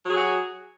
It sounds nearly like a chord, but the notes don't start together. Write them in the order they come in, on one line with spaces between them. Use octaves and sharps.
F#3 G#4 F#4